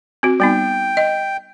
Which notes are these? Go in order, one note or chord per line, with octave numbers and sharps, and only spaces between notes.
C4 F#4
G3 B3 D#4 G5
D#5